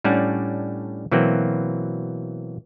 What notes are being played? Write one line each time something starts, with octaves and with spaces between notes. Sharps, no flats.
A2 G3 C#4 D4 F#5
B2 E3 F#3 A#3 C4